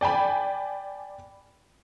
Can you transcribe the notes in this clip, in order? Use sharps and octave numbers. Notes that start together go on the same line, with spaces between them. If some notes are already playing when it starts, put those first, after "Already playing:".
D5 G5 G#5 B5